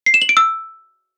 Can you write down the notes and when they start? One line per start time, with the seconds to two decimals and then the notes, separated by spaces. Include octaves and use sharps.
0.06 C7
0.14 E7
0.22 F#7
0.29 D7
0.37 E6